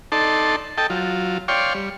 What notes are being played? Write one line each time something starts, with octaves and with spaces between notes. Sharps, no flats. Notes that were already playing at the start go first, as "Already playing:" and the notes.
D#4 A4 D5 A5 C6
A4 D#5 G5 A5
F#3 F4
C#5 D5 F5 G5 C6 C#6
G3